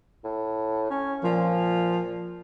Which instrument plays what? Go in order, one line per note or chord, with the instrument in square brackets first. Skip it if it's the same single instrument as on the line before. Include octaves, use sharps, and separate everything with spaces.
[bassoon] A2
C#4
[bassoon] A#2 [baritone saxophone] F3